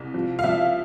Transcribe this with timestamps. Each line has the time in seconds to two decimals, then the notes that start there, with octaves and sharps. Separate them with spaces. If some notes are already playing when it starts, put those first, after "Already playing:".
Already playing: C2
0.14 F3
0.39 F5
0.44 F3 E5